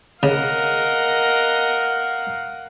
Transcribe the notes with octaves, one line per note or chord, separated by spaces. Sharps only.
C#3 A#4 D#5 F5 F#5